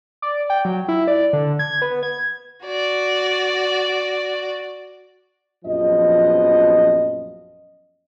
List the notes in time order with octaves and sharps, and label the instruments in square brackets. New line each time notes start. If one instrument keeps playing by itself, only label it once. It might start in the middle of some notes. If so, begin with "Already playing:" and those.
[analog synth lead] D5
G5
F#3
E4
D5
D3
G#6
B3
G#6
[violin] F#4 D5
[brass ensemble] A#1 F#2 F3 B3 D#5